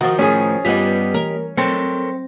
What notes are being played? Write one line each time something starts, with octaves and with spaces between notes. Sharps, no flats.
D#3 F3 F#4 A#5 D#6 A6
A2 C#4 G#4
G2 G3 B3 F4 G4 D#5
E3 A#4
F#3 C4 A4 A#4 C#5 C6 A#6